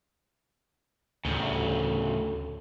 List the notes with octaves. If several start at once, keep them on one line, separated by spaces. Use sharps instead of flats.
D2 A2 C#3